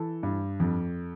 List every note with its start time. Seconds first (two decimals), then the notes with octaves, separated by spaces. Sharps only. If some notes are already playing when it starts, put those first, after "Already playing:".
Already playing: E3 A4
0.23 G2
0.60 F2